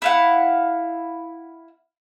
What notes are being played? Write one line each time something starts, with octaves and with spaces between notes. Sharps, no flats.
E4 F5 F#5